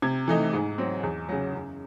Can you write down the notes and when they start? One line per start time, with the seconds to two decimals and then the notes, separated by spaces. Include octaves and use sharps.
0.02 C3 G#6
0.28 E3 A3 D#4
0.53 G#2
0.78 F#3 C4
1.03 E2
1.29 C#3 F#3
1.54 F#2